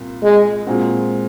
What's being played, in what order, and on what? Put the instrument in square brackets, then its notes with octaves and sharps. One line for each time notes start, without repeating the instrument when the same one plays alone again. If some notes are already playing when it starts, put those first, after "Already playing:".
Already playing: [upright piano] C2 A#2
[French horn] G#3
[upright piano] A#2 G#3 C4 F#4